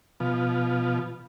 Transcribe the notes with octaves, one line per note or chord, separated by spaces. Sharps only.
B2 F3